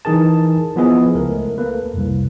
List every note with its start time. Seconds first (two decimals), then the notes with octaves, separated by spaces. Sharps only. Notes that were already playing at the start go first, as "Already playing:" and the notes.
0.05 E3 D#4 G#4 A#4 A5
0.76 F3 B3 E4 G#4 D#5
1.15 C#2 A3 A#4
1.58 A#3 A4 B4
1.94 C2 F2